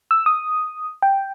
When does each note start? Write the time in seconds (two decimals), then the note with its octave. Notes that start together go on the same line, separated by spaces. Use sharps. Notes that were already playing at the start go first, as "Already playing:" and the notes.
0.11 E6
0.26 D#6
1.02 G5